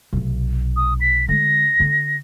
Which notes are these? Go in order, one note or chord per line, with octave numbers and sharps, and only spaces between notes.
B1 C3
D#6
B6
D3 G#3 A#6
D3 C4